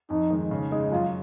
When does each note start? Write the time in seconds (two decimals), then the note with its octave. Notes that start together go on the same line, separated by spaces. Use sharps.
0.10 F2 D#4
0.30 D#3 G#3
0.51 C#3
0.72 G#3 D#4 G#4
0.92 F#2 F4